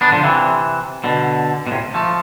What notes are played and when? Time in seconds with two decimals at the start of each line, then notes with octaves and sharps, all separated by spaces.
0.01 B3 D4
0.12 D3 F3
0.24 C3 E3
1.04 B2 D3
1.67 B2
1.71 A2 C3
1.94 F3 A3